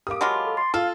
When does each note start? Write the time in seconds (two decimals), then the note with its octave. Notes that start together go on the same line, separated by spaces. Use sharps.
0.07 G4 A#4 F5 D6 D#6
0.21 F#3 G#3 F4 F5 A5 B5
0.45 A4
0.57 C6 A6
0.74 F4 A4 F5